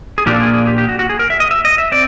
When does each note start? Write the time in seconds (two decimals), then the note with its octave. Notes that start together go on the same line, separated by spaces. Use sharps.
0.18 G#4
0.26 A#2 F3 A#3 D4 F4 G4
0.35 A4
0.40 G#4
0.54 G#4
0.67 G4
0.78 G4
0.89 F#4
0.99 F#4
1.09 G#4
1.19 A#4
1.30 E5
1.40 D#5
1.51 E5
1.65 D#5
1.78 E5
1.92 C4 D5